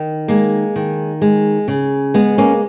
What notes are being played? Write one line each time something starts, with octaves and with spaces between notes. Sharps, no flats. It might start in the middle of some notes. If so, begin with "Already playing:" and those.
Already playing: D#3
G#3 A#3
D#3
G#3
C#3
G#3 B3
A#3 C#4